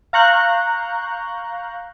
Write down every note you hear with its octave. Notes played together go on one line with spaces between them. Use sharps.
F5 A#5 C#6 F#6 G6